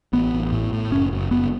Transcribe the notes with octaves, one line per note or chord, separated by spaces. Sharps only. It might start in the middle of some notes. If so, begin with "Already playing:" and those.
A1 B3
A1
A2
A2
F#1 C#4
F#1
F#1 B3